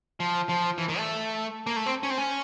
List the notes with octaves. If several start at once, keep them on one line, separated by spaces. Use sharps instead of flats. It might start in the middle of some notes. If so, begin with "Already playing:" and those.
F3
F3
E3
D#3
A3
A#3
A3
C4
C#4
C4
C#4